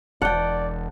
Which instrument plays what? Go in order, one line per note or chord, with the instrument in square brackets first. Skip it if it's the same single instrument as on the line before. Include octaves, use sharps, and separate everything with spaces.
[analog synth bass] E1 [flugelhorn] D5 [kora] F#5 G5 [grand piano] A5